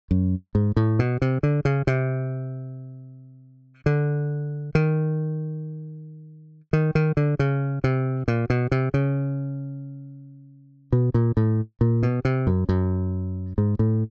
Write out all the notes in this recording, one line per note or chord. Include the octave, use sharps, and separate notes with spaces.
F#2
G#2
A2
B2
C3
D3
C#3
C3
D3
D#3
D#3
D#3
D3
C#3
C3
A#2
B2
C3
C#3
B2
A#2
A2
A#2
B2
C3
F#2
F#2
G#2
A2